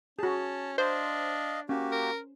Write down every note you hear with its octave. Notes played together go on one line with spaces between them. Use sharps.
C#4 F#4 G#4 A5
D4 C5 D#5 F5
A#3 C#4 F#4 G4
A#4